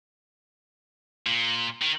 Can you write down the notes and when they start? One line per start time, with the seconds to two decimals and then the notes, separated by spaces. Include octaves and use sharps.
1.26 A#2
1.82 D#3